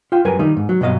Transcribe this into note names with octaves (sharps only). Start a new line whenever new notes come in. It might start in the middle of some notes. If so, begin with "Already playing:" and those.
F4 G5
F#2 G3 A#4 B4 G#5
D#3 G3 D#4
G#2
F#3
G2 B2 F#3 D#5 F5